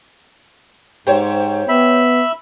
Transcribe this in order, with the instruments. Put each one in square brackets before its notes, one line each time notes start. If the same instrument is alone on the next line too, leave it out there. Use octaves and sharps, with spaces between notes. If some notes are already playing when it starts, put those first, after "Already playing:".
[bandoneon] G#2 [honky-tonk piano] G4 C5 C#5
[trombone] B3 [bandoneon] E5 B5